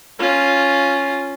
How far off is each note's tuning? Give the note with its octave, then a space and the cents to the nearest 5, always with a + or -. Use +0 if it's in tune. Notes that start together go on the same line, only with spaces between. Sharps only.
C#4 +0 F4 +0